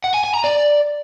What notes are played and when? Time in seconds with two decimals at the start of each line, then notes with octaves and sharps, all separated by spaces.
0.04 F#5
0.14 G#5
0.24 G#5
0.34 A#5
0.44 D5